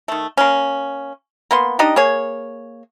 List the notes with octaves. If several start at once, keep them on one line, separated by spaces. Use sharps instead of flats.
D#3 A3
A#3 C#4
A#3 B3 C6
D4 D#4 G4 D#5
A#3 G#4 C#5